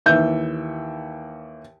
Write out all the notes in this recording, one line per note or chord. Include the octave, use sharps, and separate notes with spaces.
D#2 E3 E5 G6